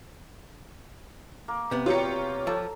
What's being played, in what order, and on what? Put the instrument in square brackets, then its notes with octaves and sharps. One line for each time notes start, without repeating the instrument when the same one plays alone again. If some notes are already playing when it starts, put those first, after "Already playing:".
[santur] A#3
[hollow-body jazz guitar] C3 B3
[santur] F#3 G3 D#6 [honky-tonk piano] F4 G4 C#7 [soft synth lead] C#5
[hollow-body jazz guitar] F3 [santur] A4